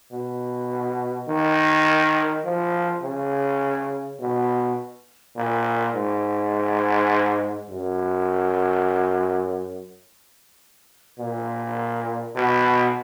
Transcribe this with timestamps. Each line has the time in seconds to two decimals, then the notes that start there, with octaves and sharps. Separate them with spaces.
0.12 B2
1.29 D#3
2.45 F3
3.03 C#3
4.20 B2
5.36 A#2
5.95 G#2
7.69 F#2
11.19 A#2
12.36 B2